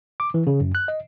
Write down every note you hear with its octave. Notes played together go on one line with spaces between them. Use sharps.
D6
E3
C#3
F#2
F#6
D#5